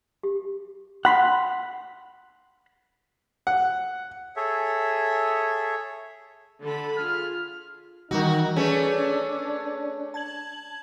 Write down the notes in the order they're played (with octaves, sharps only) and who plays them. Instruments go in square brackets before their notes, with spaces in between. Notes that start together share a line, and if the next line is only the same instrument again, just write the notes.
[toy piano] G4
[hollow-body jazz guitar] F#5 B5 C6
[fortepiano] F#5
[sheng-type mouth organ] G#4 A4 C#5 E5
[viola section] D3 A4 B5
[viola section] F4 G#4 [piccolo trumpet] F6
[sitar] D#3 F#4 [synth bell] E3 G3 A#4 [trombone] D#4
[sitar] A3 C#4 [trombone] D4 [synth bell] G#4 B4 C#5
[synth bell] A5 G#6 F#7